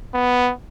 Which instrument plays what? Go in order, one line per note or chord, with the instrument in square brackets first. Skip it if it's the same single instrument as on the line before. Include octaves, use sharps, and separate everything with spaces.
[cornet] B3